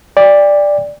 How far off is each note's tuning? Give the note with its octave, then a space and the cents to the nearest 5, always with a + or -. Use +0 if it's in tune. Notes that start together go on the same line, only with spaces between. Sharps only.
D5 +0 G5 +35